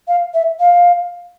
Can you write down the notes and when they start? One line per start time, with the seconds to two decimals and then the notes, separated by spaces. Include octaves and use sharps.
0.08 F5
0.34 E5
0.60 F5